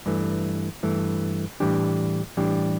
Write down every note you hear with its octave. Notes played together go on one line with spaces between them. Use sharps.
G2 E3 A3
G2 E3 A3
A2 E3 G3 D4 G4
A2 E3 G3 D4 G4